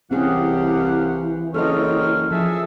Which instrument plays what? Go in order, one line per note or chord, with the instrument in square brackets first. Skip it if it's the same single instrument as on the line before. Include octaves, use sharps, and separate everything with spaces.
[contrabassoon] C2 [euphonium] E3 [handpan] C4 C#4 G#4 [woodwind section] G4 F5 F#5
[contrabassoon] F#1 [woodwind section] C4 C#5 F6 [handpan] A4 D#5
[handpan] F3 [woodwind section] G#4 A4 E5